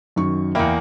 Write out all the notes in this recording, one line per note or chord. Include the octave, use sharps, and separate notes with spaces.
F#2 D#3 C#6
E2 A#3 E5 G5 B5